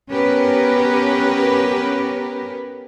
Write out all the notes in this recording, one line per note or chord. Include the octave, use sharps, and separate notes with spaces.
B3 C#4 G4 A#4 B4